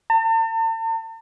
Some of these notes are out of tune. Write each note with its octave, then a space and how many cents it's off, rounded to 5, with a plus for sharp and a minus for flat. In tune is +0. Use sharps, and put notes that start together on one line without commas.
A5 +45